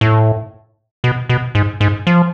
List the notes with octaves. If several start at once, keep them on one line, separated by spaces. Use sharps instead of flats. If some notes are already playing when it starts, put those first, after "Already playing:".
A2
B2
B2
G#2
G#2
F3